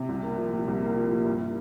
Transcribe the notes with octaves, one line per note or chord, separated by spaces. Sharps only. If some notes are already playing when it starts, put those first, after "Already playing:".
Already playing: C3
C2
A#3
F3
A#2
C2
A#3
F3
A#2
G2
E4